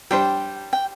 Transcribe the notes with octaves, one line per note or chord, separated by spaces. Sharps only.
G3 D4 G4 C5 G5
G5